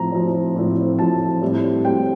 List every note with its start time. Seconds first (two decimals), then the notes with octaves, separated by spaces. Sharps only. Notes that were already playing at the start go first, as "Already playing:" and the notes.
Already playing: A2 F3 C4 A#5
0.12 A2 F3 C4
0.56 A2 F3 C4
0.99 A2 F3 C4 A5
1.42 A2 G3 C4
1.85 A2 G3 C4 G5